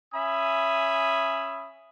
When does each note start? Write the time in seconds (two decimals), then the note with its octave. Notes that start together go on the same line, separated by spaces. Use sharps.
0.14 C#4 E5 G#5 B5 D#6